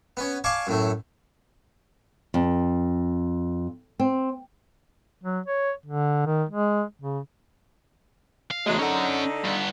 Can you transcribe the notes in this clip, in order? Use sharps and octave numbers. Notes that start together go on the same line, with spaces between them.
B3 C#4
D5 F5 G#5 A5 C#6 D6
F#2 A2 A3
F2
C4
F#3
C#5
D3
D#3
G#3
C#3
F5
E2 F#3 G#3 A3
D3 C#4 D#4 F#5
G2 B3